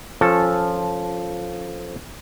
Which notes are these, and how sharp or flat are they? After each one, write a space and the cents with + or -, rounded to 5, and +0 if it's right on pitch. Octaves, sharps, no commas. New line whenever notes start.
F3 +0 C#4 -10 A4 +0